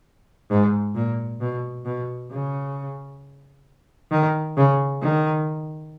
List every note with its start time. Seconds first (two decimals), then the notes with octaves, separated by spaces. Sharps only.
0.51 G#2
0.95 A#2
1.41 B2
1.86 B2
2.31 C#3
4.11 D#3
4.57 C#3
5.01 D#3